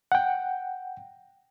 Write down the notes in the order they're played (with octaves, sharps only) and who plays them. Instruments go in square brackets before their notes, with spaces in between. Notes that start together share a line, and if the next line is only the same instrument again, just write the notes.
[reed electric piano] F#5 G5